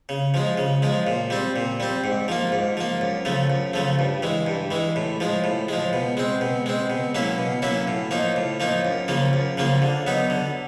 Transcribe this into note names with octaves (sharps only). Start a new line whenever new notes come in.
C#3
F3 G#3
C#3
F3 G#3
A#2
G3 C4
A#2
G3 C4
G#2
F3 A#3
G#2
F3 A#3
F#2
C#3 F3 A3
F#2
C#3 F3 A3
G2
E3 G#3
G2
E3 G#3
A2
F3 G#3
A2
F3 G#3
B2
G#3 C4
B2
G#3 C4
B2
F#3 A#3 C#4 E4
B2
F#3 A#3 C#4 E4
A2
F3 A#3 D#4
A2
F3 A#3 D#4
F#2
C#3 F3 A#3
F#2
C#3 F3 A#3
D3
F#3 B3 D#4
D3